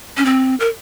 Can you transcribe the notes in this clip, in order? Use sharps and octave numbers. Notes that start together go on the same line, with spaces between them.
C#4
C4
A#4